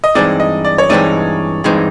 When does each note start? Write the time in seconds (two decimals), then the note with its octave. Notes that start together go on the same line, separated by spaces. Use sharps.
0.04 D#5
0.15 G2 E3 G#3 C4 D#4 D5
0.40 D#5
0.65 D5
0.78 C#5
0.89 G2 E3 G#3 C4 D#4 D5
1.64 G2 E3 G#3 C4 D#4